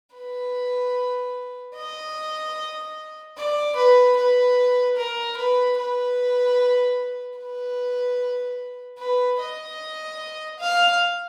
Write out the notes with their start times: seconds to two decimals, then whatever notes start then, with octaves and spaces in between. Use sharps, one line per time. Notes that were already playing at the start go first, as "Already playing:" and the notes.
0.16 B4
1.76 D#5
3.37 D5
3.76 B4
4.17 B4
4.97 A#4
5.37 B4
5.78 B4
7.38 B4
8.99 B4
9.40 D#5
10.60 F5